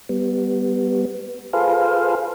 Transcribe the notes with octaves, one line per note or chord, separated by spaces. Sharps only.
G3 B3
F4 G#4 A4 B4 C5 F5